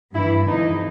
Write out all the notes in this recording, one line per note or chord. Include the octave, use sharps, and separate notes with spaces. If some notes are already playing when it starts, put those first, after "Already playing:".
G2 E3 E4
F2 C3 E3 D#4